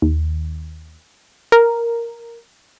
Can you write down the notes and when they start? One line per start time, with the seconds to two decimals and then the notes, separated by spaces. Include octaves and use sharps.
0.02 D#2
1.52 A#4